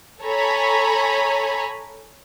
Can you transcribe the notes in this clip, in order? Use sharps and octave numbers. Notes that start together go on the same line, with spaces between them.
A4 C#5 G#5 A#5 B5